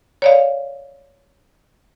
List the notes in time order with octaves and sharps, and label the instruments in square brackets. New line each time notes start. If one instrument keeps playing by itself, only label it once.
[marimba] C#5 D5 F5